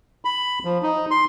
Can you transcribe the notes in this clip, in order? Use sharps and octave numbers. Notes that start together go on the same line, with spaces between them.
B5
F3
D#4
C6